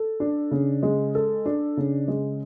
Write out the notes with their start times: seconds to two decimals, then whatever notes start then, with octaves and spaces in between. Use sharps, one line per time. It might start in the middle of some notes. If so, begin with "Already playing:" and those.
Already playing: A4
0.20 D4
0.51 C#3
0.83 G#3
1.15 A4
1.46 D4
1.77 C#3
2.08 G#3